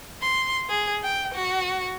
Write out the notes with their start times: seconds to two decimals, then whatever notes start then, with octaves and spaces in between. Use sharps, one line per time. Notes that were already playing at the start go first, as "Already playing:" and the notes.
0.22 C6
0.69 G#4
1.03 G5
1.34 F#4